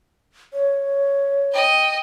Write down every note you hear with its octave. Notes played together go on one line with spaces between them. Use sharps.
C#5
D#5 G5